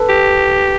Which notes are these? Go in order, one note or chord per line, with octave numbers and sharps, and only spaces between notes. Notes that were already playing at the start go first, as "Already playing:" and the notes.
Already playing: A4 B4
G4